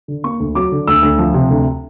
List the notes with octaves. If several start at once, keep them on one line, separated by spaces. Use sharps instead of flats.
D3
A#3 C#6
D2
F#3 D6
D3
D2 E6
D2
F3
C3
D2